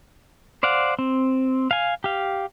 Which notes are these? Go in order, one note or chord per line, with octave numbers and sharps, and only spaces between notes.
C5 D5 F5 F#5
C4
F5 G#5
G4 F5